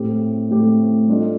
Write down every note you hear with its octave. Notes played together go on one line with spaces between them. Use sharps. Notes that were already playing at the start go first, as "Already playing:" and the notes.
Already playing: A2 A3 C4 G4
A2 A3 C4 G4
G3 D4 F4 A4 D#5